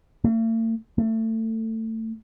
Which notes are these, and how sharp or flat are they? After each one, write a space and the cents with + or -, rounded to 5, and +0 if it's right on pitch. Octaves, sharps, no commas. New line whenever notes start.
A3 +45
A3 +25